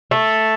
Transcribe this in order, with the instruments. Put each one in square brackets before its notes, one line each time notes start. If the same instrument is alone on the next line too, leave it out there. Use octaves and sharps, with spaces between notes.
[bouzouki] A3